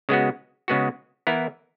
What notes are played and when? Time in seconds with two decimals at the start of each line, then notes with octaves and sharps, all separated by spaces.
0.09 C#3 G#3 B3 F#4
0.68 C#3 G#3 B3 F#4
1.27 E3 B3 E4 A#4